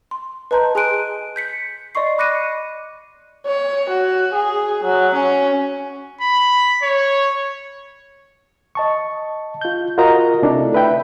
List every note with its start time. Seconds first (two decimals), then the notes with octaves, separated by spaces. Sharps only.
0.11 C6
0.51 B4 D#5 A5 A#5 C6 G6
0.75 G#4 G#5 C6 F#6 D7 D#7
1.36 G6 B6 C#7
1.95 D5 D#5 C6 C#6 C7
2.18 B5 D6 F#6 A#6 C#7 D#7
3.46 C#5
3.89 F#4
4.34 G#4
4.84 F#3
5.14 C#4
6.21 B5
6.83 C#5
8.75 D#5 A5 C#6
9.61 F4 G6
9.98 F4 F#4 A#4 D#5 A#5
10.42 C3 A3 D4 E4 A4
10.74 B4 E5 G5 B5